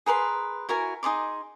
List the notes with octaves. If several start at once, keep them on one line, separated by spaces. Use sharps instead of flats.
G#4 A#4 B4 C6
E4 F#4 A#4 G#5
D#4 G#4 C6 D6